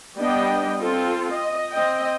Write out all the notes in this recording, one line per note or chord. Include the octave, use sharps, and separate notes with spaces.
G3 B3 D4 D#5 G5
C4 F4 A4
D#5
C4 D#5 G5